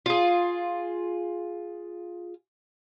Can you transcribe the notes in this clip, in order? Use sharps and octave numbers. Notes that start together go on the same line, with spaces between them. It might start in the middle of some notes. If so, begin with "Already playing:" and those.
F4 G#4